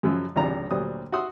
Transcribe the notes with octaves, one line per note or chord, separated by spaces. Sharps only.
F#2 C#3 F3 F#3 G#3
G#1 C#2 C3 F3 D4 A#5
D2 A#2 F#3 G3 C5 D#6
F#4 E5 F#5 C6 D#6 E6